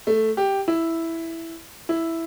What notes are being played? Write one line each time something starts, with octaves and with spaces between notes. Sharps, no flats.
A3
G4
E4
E4